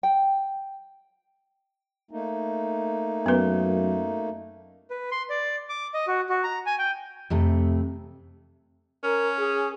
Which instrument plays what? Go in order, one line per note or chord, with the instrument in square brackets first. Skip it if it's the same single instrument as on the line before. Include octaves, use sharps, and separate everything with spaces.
[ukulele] G5
[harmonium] A3 A#3 D#4
[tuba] F#2 [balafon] B3 B4
[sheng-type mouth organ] B4
C6
D5
D6
D#5
F#4
F#4
A#5
G#5
G5
[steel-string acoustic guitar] F2 C3 A3
[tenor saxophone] C#4 [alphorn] A#4
[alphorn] G#4